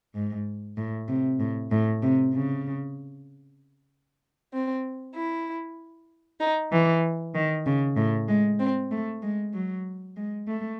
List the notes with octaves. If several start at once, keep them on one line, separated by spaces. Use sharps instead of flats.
G#2
A2
C3
A2
A2
C3
C#3
C4
E4
D#4
E3
D#3
C#3
A2
G#3
C4
A3
G#3
F#3
G#3
A3